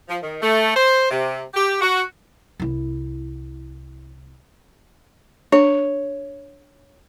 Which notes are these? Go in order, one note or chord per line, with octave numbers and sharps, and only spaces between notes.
F3
D#3
A3
C5
C3
G4
F#4
C2 E4
D4 C#5